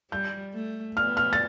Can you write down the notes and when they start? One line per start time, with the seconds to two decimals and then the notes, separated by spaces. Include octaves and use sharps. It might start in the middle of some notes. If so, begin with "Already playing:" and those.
0.11 G3 G6
0.54 A3
0.96 B3 F6
1.17 F6
1.33 A6